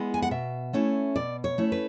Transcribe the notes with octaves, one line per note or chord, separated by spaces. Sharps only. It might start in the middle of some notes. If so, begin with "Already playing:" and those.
Already playing: G#3 B3 E4
G#5
F#5
B2 E5
A3 C#4 E4
B2 D5
C#5
A3 C#4 E4
B4